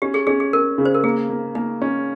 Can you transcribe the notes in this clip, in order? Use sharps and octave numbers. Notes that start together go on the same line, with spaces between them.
C#4 G4
G#4
C#4 G#4
G#4
C#4 A#4
C#3
C5
A#4
A#3 G#4
A#3
A#3 D#4
C#4